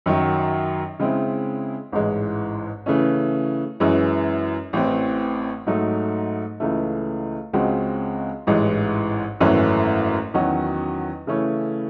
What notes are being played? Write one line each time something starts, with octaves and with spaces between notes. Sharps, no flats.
F#2 D#3 F#3
C#3 G#3 C4 E4
A1 G#2 E3 G#3
C#3 E3 A3 C#4
F#2 E3 G#3 C#4
A1 A2 E3 C4
G#2 F#3 A3 D#4
C#2 C#3 E3 A3
C#2 C#3 G#3 C4 F#4
A1 G#2 E3 G#3
G#1 F#2 E3 A3 C#4
E2 D#3 F#3 C#4 F#4
C#3 E3 A3 C#4 E4